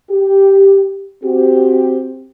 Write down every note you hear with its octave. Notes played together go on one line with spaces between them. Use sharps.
G4
C4 F#4 G4